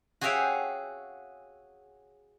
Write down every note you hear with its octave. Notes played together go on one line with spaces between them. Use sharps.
F#4 G#4 C#5 E5 F5 G5